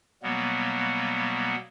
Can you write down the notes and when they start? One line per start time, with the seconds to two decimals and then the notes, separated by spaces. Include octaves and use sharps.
0.23 B2 F#3 G3 A#3 B3